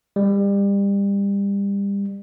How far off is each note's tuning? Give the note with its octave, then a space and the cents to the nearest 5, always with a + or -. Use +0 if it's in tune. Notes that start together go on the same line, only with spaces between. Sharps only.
G3 +30